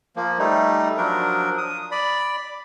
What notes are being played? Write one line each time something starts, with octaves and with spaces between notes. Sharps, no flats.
F3 A#3
G3 A3 D#4
F3 F#3 D4 A#4
D#6
D5 B5